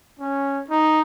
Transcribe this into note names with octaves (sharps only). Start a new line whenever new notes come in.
C#4
D#4